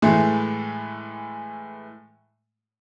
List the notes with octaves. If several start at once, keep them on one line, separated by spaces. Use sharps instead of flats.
A2 E3 G#3 A3